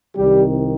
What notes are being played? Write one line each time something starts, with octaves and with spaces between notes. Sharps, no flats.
C2 C3 D#3 G3 G4